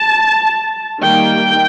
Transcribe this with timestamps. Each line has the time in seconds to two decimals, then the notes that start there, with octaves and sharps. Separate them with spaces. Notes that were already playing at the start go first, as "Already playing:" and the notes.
Already playing: A5
1.00 D#3 G3 A#3 G5